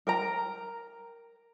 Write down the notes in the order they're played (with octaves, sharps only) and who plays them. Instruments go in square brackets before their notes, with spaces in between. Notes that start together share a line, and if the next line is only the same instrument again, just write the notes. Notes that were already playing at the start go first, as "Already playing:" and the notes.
[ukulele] A#4 G5 A#5